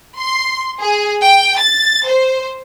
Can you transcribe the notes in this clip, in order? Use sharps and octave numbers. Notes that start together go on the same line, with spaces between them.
C6
G#4
G5
A6
C5